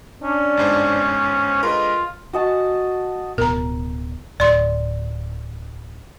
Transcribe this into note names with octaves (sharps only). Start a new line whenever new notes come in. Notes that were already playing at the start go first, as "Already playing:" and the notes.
C#4 D4
G1 G#2 C5
D3 G#3 F4 A#4 B4 D#5
F#4 D#5 A5
D1 B2 A#4 A#5
D1 D5 C6